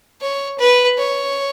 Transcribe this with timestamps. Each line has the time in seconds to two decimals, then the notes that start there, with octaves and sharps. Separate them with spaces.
0.21 C#5
0.58 B4
0.98 C#5